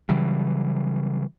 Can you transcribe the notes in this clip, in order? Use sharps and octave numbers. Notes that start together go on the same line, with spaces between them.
C#3 E3 F#3 G3